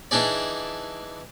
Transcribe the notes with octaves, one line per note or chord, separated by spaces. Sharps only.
E3 D4 D#4 G#4 D5